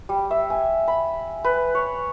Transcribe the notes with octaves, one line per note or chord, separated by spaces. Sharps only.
G3
E5
G#5
B5
B4
C#5